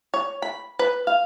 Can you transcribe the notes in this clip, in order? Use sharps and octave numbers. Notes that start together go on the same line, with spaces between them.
C#5
B5
B4
F5